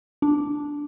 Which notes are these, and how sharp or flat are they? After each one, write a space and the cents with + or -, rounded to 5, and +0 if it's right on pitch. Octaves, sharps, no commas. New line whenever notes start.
D4 -5